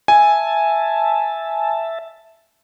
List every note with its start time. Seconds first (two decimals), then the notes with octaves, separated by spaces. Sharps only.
0.08 E5 G#5 A5